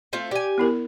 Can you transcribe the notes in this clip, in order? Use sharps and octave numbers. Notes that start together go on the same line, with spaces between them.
A3 C4 F4
G4 D5 G#5
B3 E4 A#4